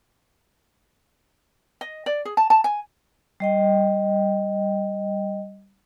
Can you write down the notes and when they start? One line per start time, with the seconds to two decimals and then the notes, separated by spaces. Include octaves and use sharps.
1.81 D#5
2.06 D5
2.25 G#4
2.37 A5
2.50 A5
2.64 G#5
3.40 G3 D#5 G5